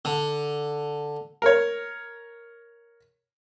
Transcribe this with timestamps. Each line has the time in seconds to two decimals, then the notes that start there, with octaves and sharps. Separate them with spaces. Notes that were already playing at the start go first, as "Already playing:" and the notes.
0.05 D3
1.42 A#4 C#5